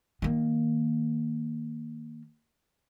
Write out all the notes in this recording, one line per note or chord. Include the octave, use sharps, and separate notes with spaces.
D#3 A#3